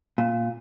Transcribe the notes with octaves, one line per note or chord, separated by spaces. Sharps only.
A#2